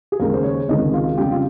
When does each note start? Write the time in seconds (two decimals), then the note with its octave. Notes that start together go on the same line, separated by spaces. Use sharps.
0.12 G#4
0.20 D#2 C#3 G#3 A#4
0.33 C5
0.44 C#5
0.68 C#2 C3 D#3 G#3 D#5
0.93 F4
1.08 F4
1.17 F2 C#3 G3 G4
1.32 F4